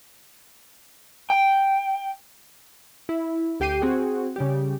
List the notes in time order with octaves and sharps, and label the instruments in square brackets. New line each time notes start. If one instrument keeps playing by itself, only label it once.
[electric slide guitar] G5
[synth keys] E4
D2 G4 G5 C7 D#7
C4 F#4 G#4
C#3 G3 G4